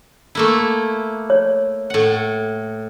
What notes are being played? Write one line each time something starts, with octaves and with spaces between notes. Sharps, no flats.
A3 A#3 E4
C#5
A2 F#5